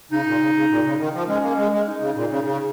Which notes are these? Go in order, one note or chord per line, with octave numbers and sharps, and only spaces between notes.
C#3 D#4
A#2
C#3
C#3
A#2
C#3
D#3
F3
G#3 C#4
A#3
G#3
G#3
D#4
C#3
A#2
C#3
C#3